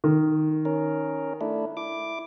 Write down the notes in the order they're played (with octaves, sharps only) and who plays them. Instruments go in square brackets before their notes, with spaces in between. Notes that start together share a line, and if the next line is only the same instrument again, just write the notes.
[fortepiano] D#3
[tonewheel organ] C#4 A#4
A3 D4 E4
E4 D6